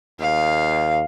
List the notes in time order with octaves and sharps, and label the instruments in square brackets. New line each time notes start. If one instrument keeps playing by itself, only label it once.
[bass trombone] D#2 [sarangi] F5